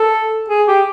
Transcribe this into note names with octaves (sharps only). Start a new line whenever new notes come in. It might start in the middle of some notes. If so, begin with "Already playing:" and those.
Already playing: A4
G#4
G4